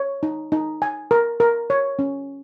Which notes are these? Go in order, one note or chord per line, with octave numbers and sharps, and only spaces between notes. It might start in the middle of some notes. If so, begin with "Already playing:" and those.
Already playing: C#5
D#4
D#4
G#5
A#4
A#4
C#5
C#4